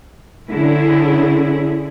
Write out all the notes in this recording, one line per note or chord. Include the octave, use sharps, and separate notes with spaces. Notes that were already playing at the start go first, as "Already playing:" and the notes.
D3 C#4 E4 G#4